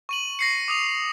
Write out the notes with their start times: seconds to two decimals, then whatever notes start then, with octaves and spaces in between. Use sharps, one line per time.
0.09 C#6 D#7 F#7
0.39 A#6 C7 C#7
0.68 D6 D#6 F7